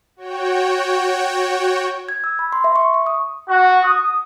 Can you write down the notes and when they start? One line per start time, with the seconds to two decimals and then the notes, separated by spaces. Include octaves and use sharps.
0.16 F#4 C#5 G5
2.09 G#6
2.24 E6
2.39 B5
2.52 C6
2.64 E5
2.76 C#6
2.94 C#6
3.06 D#6
3.49 F#4
3.83 D#6